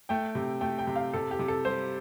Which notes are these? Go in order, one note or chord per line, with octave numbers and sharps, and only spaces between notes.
A3 G5
C3
A3 G5
G5
C3
F5
C3 A4
G4
C3
A4
G3 C5